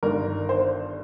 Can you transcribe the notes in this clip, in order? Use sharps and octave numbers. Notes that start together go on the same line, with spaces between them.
G1 G2 D#3 A#4
C5